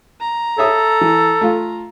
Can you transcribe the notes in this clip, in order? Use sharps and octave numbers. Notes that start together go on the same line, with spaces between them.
A#5
A4 C#5 E5 D#6
E3
A3 F4